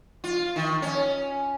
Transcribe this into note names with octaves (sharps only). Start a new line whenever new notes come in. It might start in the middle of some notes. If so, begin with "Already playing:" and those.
F4
D#3
C#4